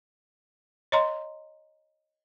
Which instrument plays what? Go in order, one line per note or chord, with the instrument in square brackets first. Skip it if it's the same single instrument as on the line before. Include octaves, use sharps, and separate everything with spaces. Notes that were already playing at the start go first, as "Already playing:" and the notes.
[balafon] C#5 D#5 A#5 C6